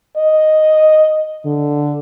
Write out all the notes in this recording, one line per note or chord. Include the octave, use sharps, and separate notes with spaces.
D#5
D3